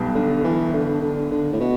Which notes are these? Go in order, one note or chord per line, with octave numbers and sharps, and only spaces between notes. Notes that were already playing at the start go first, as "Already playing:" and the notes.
Already playing: B1 B2 G3
D3
E3
D3
D3
D3
A2
B2